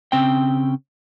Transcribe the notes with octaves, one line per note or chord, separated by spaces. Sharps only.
C#3 C4 G5